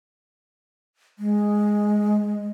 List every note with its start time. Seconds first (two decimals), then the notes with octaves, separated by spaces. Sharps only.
1.19 G#3